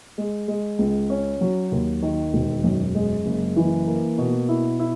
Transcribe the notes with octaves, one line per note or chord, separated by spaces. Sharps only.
G#3
G#3
C#2
C#4
F#3
D#2
D#3
E1
F#2
G#3
F#1
E3
A#3
B2
E4
E4